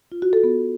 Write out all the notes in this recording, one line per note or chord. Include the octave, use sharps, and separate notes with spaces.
F4
F#4
A4
B3